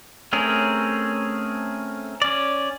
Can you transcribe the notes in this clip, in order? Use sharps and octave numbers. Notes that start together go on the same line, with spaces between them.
A3 C4 C#4 G#4 A#4
C#4 D5